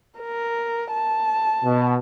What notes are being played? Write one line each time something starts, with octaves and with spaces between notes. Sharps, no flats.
A#4
A5
B2